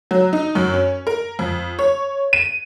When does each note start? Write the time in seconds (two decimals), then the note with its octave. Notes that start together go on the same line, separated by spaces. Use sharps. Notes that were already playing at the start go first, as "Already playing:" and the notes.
0.11 F#3
0.33 D#4
0.55 F#2
0.74 C#4
1.07 A#4
1.39 F2
1.79 C#5
2.33 D#7